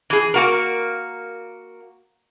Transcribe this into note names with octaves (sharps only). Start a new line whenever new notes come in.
E3 G#4
A#3 F#4 A#4